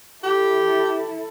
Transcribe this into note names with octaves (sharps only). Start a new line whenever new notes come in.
E4 G4 A4